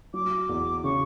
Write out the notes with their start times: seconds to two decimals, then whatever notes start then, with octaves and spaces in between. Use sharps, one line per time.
0.14 F#3 D6
0.49 E2
0.84 C#3 C#6